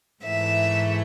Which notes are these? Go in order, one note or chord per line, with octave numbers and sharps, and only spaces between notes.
G#2 E3 A3 E5